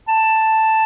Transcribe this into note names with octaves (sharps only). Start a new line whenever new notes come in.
A5